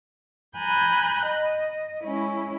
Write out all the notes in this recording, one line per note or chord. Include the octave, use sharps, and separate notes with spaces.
G#5 A#5 B5 F#6 G6
D#5
G#3 C#4 E4